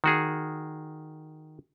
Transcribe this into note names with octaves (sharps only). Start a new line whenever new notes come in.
D#3 F#4 G#4